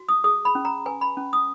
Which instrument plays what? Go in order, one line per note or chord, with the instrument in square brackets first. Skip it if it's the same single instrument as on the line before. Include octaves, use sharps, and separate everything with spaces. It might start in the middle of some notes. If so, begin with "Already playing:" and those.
Already playing: [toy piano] F#4
D#6
G#4 D#6
B5
C#4
A#5
B4 G#5
B5
C#4
D#6